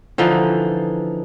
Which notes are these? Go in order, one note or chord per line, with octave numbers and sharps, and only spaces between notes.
D3 E3 F3 D#4